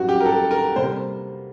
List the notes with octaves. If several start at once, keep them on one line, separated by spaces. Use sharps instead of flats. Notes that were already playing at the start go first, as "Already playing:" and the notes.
Already playing: A1 G2 F#3 F#4
G4
A#4
A4
A#4
C3 G3 A#3 C5